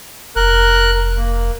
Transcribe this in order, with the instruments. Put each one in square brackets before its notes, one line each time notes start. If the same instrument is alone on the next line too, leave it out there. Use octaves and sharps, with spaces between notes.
[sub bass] F1 [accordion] A#4 F#6
[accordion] A#3